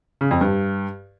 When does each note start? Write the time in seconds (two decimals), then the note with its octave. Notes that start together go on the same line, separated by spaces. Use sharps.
0.21 C#3
0.31 F2
0.41 G2